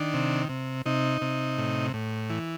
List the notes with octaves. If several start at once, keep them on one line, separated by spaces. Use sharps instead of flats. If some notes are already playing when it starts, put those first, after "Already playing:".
Already playing: D#3 D4
C3
C3
C3 D#4
C3
A2
A2
E3